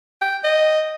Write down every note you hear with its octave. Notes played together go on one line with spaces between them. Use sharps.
G5
D#5